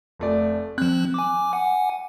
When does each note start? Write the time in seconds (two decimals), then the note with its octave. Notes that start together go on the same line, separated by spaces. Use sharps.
0.19 F1 A3 D5
0.78 F3 C4 F#6
1.14 G#5 D6
1.53 F#5 G#5